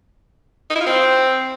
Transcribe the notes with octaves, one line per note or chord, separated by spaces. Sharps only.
D#4
E4
F4
C4